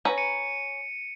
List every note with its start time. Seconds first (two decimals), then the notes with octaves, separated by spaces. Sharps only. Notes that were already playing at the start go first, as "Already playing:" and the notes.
0.05 C#4 B4 A#5
0.18 C#7 D#7